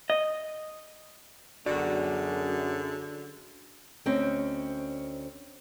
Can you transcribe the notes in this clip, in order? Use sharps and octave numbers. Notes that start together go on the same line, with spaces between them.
D#5
F#2 D3 F#4 G#4 D5
D2 C4 C#4 D#5 G5